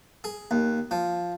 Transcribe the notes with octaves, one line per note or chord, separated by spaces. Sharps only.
G#4
D#2
F3